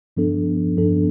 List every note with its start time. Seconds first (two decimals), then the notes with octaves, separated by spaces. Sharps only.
0.17 G2 F3 B3 D4 A4
0.77 G2 F3 B3 D4 A4